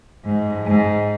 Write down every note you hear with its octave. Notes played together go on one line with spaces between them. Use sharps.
G#2
G#2